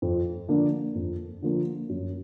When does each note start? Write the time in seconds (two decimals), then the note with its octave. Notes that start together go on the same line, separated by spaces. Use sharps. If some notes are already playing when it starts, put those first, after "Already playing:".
0.02 F2
0.49 D3 F3 A#3 D4
0.95 F2
1.42 D3 F3 A#3 D4
1.89 F#2